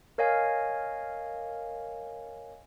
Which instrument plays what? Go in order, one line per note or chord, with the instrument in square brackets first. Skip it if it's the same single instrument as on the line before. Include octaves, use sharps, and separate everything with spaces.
[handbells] A#4 C#5 D#5 F5 G#5